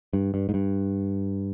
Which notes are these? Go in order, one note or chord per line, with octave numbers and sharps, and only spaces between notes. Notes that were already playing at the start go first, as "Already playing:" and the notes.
G2
G2
G#2
G2